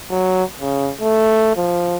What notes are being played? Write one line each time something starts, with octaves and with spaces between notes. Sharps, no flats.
F#3
C#3
A3
F3